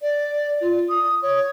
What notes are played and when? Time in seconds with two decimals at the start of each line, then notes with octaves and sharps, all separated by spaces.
0.02 D5
0.61 F4
0.89 D#6
1.22 C#5